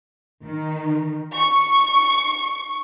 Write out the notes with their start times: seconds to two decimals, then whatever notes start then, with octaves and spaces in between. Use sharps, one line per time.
0.43 D#3
1.34 C#6